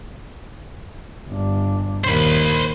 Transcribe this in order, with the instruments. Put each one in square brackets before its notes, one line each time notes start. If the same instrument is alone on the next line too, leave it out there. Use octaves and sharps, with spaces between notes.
[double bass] G1 D4
[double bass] D#2 A#2 [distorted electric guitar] C5 B5